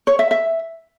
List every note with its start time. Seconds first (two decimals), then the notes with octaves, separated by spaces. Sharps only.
0.07 C#5
0.19 E5
0.31 E5